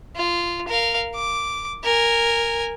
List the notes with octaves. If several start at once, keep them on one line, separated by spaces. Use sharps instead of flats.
F4
A#4 F5
D6
A#4 G#5